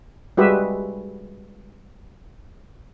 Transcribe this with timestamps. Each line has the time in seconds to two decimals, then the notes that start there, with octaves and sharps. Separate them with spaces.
0.37 G3 G#3 F#4 G4 B4 E5